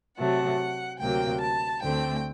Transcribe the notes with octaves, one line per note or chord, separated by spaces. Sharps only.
C3 F#3 A3 F#5
D2 C3 F#3 A#3 G5
A5
D2 D3 A3 C4 G5